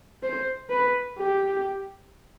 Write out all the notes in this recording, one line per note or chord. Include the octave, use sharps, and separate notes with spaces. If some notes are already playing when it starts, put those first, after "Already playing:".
C5
B4
G4